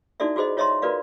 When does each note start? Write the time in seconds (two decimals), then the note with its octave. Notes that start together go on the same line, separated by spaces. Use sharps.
0.20 D#4 E4 F#4 A4 D5 E5
0.36 F4 F#4 G#4 C5 D#5
0.57 F4 C#5 D#5 E5 A#5 C6
0.82 F4 F#4 A#4 B4 D5 F5